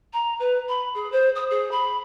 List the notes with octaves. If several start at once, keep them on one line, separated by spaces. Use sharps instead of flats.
A#5
B4
B5
G#4
C5
D#6
G#4
B5